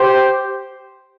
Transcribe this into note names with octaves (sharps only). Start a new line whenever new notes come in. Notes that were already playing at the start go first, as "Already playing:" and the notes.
Already playing: G4 C5